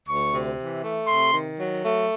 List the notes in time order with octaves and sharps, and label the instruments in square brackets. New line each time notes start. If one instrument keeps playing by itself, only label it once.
[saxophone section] D2 [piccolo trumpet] C#6
[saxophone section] C3
E3
A3
[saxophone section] C3 [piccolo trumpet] C6
[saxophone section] D#3
F#3
A3